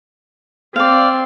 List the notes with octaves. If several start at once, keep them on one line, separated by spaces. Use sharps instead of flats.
C4 D5 F5